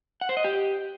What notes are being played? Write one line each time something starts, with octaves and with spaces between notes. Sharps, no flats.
F#5
C5
D#5
G4